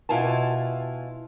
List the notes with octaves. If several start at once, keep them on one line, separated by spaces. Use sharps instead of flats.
B2 E4 F4 G#5 A5